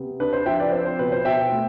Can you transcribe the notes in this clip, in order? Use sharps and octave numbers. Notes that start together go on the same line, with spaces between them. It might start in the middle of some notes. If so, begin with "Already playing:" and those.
Already playing: C3 B3
D4 B4
C5
F3 E5 G5
B4 D5
C4 C5
C5
B2 B4
C5
B2 E5 G5
A3